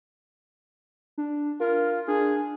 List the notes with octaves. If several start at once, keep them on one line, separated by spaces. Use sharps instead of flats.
D4
F4 A#4
D4 G#4